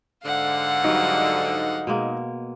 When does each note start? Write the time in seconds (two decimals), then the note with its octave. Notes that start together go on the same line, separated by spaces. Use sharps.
0.25 G#2 D3 F5 F#5
0.84 F#3 G3 D#4 B4
1.87 B2 G#3 A#3